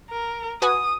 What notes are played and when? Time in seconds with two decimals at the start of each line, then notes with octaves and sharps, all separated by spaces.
0.10 A#4
0.62 F#4 B4 G#5 D#6